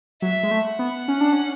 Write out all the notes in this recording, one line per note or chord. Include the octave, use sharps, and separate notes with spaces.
F#3 E5
G#3
A3
F#5
B3
C#4
D4
C#4